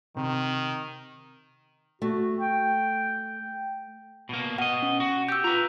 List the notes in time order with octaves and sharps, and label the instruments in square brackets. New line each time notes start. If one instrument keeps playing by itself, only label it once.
[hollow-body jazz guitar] C3 [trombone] D#3
[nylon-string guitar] A3 [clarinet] F#4
[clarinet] G5
[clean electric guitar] B2 A#3
[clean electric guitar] B2 D#5 [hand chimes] F#5
[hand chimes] C#4
[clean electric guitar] F#4
[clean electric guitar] G4 [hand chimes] E6 G6
[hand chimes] F4 [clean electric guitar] B4 A#5